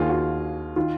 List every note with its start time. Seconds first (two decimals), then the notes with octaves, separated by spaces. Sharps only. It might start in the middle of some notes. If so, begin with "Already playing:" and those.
Already playing: D#2 D#3 A#3 F4 G#4
0.09 F#4
0.76 D#3 F4